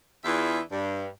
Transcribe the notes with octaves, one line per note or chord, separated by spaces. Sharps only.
E2 E3 D4 F4 G#4 E5
G2